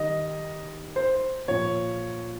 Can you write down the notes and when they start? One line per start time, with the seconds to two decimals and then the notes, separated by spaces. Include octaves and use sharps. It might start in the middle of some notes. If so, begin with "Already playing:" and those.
Already playing: D#3 G3 D#5
0.96 C5
1.48 A#2 F3 C#5